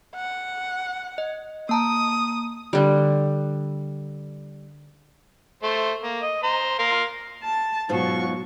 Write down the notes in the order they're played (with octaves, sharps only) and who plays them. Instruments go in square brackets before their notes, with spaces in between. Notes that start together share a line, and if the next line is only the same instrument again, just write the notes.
[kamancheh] F#5
[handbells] D#5
[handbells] A#3 A5 A#5 [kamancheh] D#6
[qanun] D3 G3
[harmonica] A3 C5
A#3
D#5
C5 A#5
A#4 F5 C6
[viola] A5
[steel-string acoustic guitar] G#2 B2 F4 [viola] F#3 C#6